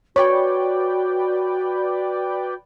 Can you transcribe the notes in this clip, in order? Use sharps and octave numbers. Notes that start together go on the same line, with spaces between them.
F#4 B4 C#5 D5 G5